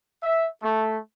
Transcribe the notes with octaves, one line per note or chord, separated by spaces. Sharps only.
E5
A3